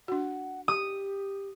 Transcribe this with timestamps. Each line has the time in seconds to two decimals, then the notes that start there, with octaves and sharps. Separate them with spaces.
0.08 D4 F#4 F#5
0.68 G4 D#6